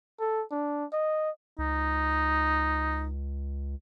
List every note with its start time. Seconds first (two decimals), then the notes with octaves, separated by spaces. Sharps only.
0.20 A4
0.51 D4
0.92 D#5
1.59 C#2 D#4